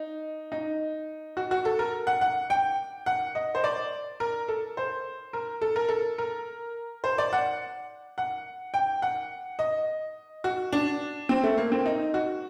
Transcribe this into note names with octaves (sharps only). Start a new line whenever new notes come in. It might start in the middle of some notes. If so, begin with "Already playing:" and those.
Already playing: D#4
D#4
F#4
F#4
A4
A#4
F#5
F#5
G5
F#5
D#5
C5
D5
A#4
A4
C5
A#4
A4
A#4
A4
A#4
C5
D5
F#5
F#5
G5
F#5
D#5
F#4
D4
C4
A3
A#3
C4
D#4
F#4